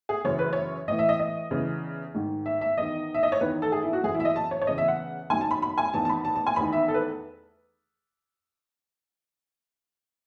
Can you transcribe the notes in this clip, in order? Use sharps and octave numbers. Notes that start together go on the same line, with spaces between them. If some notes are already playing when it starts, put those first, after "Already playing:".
G#4
F#2 C#3 E3 C#5
B4
C#5
A2 E3 D#5
E5
D#5
D#5
E2 C#3 E3
G#2 D#3
E5
E5
E2 D#3 D#5
E5
D#5
C#5
E2 D#3 B4
A4
G#4
E4
F#4
F#2 E3 G#4
E4
E5
D#5
A5
C#5
C#5
E2 C#3 E3 D#5
E5
F#5
F#2 D#3 G#5
A5
B5
B5
G#5
E2 D#3 A5
A5
B5
A5
A5
G#5
E2 D#3 B5
E5
A4
B4